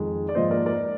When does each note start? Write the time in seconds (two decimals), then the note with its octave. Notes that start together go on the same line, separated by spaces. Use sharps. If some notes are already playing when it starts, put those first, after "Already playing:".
Already playing: F2 D#3 G#3
0.29 D5
0.35 G#2 F3 A#3 C5 D#5
0.51 A#4 D5
0.66 A#4 D5